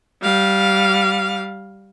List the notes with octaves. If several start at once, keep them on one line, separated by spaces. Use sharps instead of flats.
G3 F5